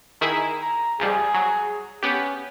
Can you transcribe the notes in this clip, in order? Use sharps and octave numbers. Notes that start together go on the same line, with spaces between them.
D#3 E4 G#4 A#5
A#5
C#2 F3 G3 G#4
F#3
B3 C#4 G4